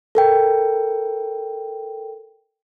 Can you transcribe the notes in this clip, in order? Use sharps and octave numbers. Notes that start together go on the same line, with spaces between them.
A4 A#4 G5